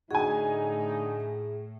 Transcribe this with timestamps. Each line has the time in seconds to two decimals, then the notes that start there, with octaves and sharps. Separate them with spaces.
0.11 A2 D3 D#4 F#4 G#4 G#5